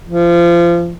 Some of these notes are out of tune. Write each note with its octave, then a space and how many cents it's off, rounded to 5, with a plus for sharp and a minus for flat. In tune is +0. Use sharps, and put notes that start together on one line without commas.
F3 -30